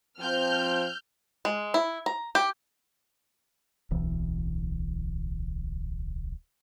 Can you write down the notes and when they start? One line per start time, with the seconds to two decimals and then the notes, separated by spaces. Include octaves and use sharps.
0.19 F3 C4 F6 G6
1.45 G#3
1.74 E4
2.06 A#5
2.35 G4
3.91 D1 B1 E3